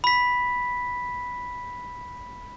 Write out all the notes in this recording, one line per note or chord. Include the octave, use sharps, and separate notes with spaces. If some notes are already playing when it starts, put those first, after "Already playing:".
B5 B6